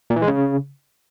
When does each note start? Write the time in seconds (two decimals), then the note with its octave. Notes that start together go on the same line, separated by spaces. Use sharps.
0.10 A#2
0.16 E3
0.22 G#3
0.28 C#3